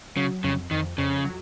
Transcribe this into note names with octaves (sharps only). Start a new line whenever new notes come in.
C#3 F#3
F2 C#3
F2 D#3
F2 C#3
F#3